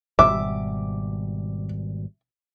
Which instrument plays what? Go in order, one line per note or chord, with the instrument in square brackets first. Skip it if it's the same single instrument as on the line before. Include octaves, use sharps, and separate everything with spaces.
[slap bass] G#1 B2 G3 [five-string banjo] E5 [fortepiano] D6